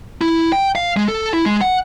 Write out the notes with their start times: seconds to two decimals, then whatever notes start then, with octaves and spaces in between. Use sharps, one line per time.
0.21 E4
0.52 G5
0.75 F5
0.97 G#3
1.08 A4
1.34 E4
1.46 G#3
1.61 F#5